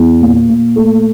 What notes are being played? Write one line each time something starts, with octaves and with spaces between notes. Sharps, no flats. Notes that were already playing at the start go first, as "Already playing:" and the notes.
Already playing: E2
A#2
A#2
A3